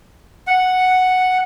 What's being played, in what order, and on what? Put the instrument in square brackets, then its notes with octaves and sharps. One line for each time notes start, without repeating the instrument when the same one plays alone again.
[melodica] F#5